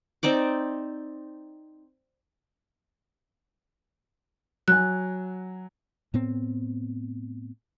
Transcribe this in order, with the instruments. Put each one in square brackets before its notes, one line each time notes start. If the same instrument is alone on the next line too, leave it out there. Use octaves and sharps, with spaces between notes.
[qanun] C4 D#4 D5 D6
[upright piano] F#3 G#5 [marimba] F#6
[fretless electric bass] A2 B3 C4